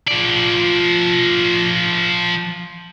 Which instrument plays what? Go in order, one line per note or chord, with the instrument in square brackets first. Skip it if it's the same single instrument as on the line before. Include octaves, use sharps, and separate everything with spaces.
[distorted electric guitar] F3 D5